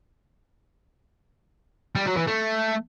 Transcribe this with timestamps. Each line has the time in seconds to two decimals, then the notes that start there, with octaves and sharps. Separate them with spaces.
1.95 G3
2.06 F#3
2.17 E3
2.27 A3